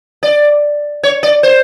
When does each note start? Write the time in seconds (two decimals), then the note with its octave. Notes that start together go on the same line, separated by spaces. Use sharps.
0.23 D5
1.03 C#5
1.23 D5
1.43 C5